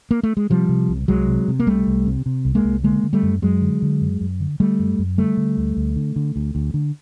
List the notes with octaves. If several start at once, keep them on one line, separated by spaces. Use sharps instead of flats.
A#3
A3
G#3
C3 F3 G3
C3
C2
C2 F#3 G#3
C3
C3
A#3
C2 G3 A3
C2
C3
C3
C2
G#3 A#3
C2
D3 G#3 A#3
D3
G3 A3
F#2
F#2 F#3 G#3
D3
D3
F#2
F#2
D3
D3 G3 A3
F#2
F#2
D3 G3 A3
D3
D2
D2
D3
D3
D2
D2
D3